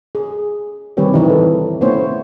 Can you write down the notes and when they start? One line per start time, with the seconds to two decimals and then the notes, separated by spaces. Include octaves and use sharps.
0.15 G#4
0.97 D#3 G3 C4 G4 B4 C#5
1.14 E3 D#4
1.30 A4
1.81 A3 B3 C#4 E4 C5 C#5